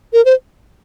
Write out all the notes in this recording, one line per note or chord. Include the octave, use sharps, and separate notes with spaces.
A#4
C5